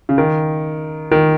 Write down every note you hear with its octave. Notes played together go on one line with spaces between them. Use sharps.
C#3
D#3
D#3